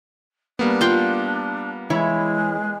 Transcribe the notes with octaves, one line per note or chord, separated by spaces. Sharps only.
G3 A#3 B3 D4
F4 G5
E3 G#3 E4 C#5